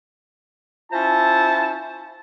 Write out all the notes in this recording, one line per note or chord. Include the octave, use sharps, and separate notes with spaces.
C#4 E4 F4 C5 A5